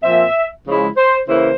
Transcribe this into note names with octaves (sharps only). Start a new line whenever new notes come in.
A#2 F3 C4 E5
C#3 F3 G#3 E4
C5
C#3 E3 A#3 E4 C5